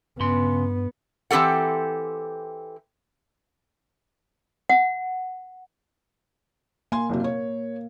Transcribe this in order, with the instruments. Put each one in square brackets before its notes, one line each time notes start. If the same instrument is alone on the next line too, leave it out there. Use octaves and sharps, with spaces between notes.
[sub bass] G2 [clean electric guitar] C#3 C6 [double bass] B3
[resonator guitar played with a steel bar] E3 C4 G4 A4 F#5
[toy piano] F#5
[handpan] A#3 [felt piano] G#5 C6
[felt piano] F#1 C3 F#3
C#5